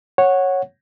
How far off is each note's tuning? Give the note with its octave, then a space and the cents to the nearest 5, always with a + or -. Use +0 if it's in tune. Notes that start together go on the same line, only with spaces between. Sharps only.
C#5 -10 F#5 -5